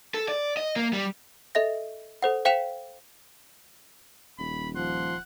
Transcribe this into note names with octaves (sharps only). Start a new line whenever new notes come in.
A4
D5
D#5
A#3
G3
A4 D#5 E5 A#6
A4 C5 F#5
C5 F5 G5 B6 E7 F7
D#1 B5
F3 F#5 C6